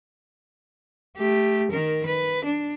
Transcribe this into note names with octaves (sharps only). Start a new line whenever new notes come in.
A3 G4
D#3 A#4
B4
D4